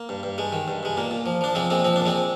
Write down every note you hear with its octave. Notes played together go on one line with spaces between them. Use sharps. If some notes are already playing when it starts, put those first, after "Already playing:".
Already playing: A#3
G2
G2
G2 G#3
D#3
G2
G2 G#3
A#2 A#3
A#2
F3
F3 D4
F3 G#3 C4
A#2 G#3 C4
F3 C4
A#2 D4
G#3 C4